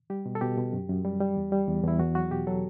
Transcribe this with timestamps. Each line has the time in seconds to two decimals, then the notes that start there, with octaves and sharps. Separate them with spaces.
0.10 G3 G4
0.26 B2
0.35 A4
0.41 B2 G4
0.57 B2
0.73 F#2
0.89 F#2
1.04 G3
1.20 G3
1.36 E2
1.52 G3
1.68 E2
1.83 E2 E4
1.99 E2 F#4
2.15 F#3 F#4
2.31 B2 G4
2.47 F#3 A4